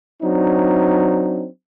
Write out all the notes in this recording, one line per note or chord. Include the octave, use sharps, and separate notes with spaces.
F#3 C4 D4 D#4